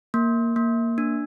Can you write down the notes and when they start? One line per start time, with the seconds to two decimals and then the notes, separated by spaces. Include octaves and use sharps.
0.14 A#3
0.56 A#3
0.98 D4